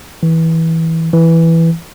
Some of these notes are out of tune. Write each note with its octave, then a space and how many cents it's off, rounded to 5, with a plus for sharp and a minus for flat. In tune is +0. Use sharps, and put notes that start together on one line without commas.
E3 -20
E3 +0